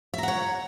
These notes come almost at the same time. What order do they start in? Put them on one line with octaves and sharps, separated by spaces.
E5 A#5 F#5 C#5